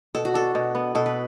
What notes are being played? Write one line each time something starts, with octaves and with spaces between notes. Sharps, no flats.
B2 A4
F#4
D4 A4
B2
B3
B2 A4
B4